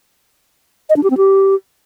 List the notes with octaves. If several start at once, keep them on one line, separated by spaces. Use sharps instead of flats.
D#5
D4
G4
C4
G4